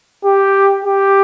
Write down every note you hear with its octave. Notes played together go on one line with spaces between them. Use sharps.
G4
G4